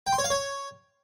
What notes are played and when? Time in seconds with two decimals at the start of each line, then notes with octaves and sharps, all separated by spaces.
0.07 G5
0.13 C6
0.18 C#5
0.24 F5
0.30 C#5